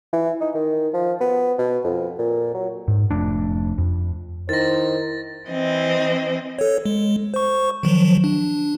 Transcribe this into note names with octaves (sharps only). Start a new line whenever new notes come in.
E3
D#4
D#3
F3
B3
B2
F2
A#2
F#3
G#2
F1 F2 A3 D4
F2
D#3 E4 A#4 C5 A6 A#6
E3 C4 D#5
A4 C#5
G#3
C5 C#6
D#3 F3 F#3
D4